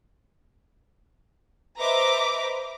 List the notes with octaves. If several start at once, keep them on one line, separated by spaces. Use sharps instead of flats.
B4 C5 D#5 E5 A#5 D6